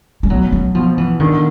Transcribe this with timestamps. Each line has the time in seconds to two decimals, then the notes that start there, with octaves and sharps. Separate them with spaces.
0.23 G3
0.30 B2 F#3
0.52 F#3
0.75 B2 F3
0.98 E3
1.20 D3 D#3